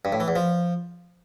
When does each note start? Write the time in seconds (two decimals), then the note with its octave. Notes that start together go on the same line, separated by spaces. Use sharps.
0.05 G2
0.13 A2
0.20 E3
0.28 E2
0.36 F3